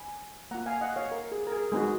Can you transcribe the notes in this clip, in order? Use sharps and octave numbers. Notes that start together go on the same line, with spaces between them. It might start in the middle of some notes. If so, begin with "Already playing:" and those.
Already playing: G#5 B5
A#3 F4 F#5 A#5
F5 G#5
D#5 F#5
C#5 F5
A#4
G#4
A#4
G#4
G#3 B3 D#4 F#4 G#4